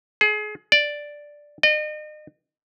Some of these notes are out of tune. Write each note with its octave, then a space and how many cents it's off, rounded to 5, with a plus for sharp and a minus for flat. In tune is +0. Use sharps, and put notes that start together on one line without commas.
G#4 +30
D5 +0
D#5 -40